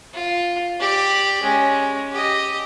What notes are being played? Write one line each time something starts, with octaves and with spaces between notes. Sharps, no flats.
F4
G4 D5
G#3 C#4
G4 D#5